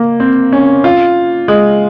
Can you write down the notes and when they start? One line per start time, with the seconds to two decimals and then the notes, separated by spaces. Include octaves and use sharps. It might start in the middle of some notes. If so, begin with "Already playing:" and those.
Already playing: A#3
0.20 C4
0.52 C#4
0.84 F4
1.48 G#3